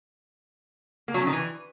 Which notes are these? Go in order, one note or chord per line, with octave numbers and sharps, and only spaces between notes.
A#3
F#3
C#4
D#3
E3